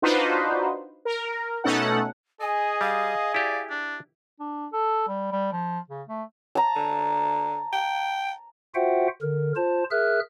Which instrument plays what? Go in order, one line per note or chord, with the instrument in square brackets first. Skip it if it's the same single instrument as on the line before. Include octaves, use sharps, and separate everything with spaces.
[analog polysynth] D4 D#4 F4 F#4 B4 C5
A#4
B2 A3 C#4 D#4 A4 F#5
[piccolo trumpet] G#4 [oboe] D#5 [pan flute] G#5
[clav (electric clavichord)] G3 [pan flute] F5
[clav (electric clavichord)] E4 G4 [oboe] D5
[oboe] D4
[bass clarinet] D4
A4
G3
G3
F3
C#3
A3
[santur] A5 A#5
[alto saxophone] D3
G5
[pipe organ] F4 F#4 C5 E5 F#5 G5
D3 A#4
F4 C5 A5
G#4 A#4 E5 F6 F#6